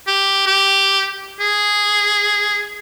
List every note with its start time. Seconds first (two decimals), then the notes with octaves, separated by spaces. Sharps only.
0.07 G4
0.46 G4
1.40 G#4